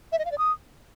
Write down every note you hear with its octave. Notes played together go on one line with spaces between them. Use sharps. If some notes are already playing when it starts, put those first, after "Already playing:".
E5
D#5
F5
D5
D#6